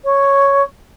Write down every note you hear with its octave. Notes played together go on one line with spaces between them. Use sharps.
C#5